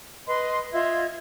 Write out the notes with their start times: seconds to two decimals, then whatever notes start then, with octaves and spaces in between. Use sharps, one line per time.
0.27 B4 D#5 C6
0.73 F4 D#5 E5 G#6